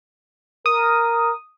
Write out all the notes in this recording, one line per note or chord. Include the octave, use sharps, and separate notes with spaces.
A#4 D#6